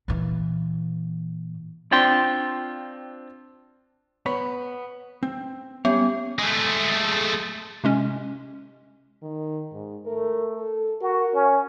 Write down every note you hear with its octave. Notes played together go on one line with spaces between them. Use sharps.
A#2 E3
C4 D4 F4 G5 C6
B3 C#5 B5
C4
G3 B3 C#4 C#5
G#3 A3
C3 G#3 C#4
D#3
G#2
A3 A#4
A4
F#4 A#4
C#4